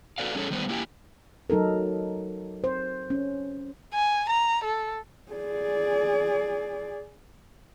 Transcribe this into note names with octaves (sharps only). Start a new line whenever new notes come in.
F#4 A4 B4 D5 F5
G3 C#4 G#4 A4 C#5
D#3 G3 B3 B4 C5
A#3 E4 G4 G5 G#5
F#3 D#4 A4 A#4
C5
C#4
G#5
A#5
A4
G#4 D5